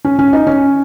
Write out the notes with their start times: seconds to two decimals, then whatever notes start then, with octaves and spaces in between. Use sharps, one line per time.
0.05 C#4
0.19 C#4
0.33 D#4
0.47 C#4